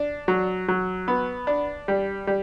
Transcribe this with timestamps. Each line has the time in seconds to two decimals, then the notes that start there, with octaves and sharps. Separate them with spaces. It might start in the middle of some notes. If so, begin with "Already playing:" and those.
Already playing: D4
0.28 F#3
0.68 F#3
1.08 B3
1.47 D4
1.88 G3
2.27 G3